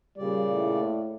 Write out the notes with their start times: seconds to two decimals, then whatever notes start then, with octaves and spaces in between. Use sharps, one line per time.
0.18 A#2 C#3 G3 D5
0.52 A2